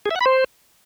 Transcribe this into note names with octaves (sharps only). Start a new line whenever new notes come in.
G#4
E5
F#5
B5
C5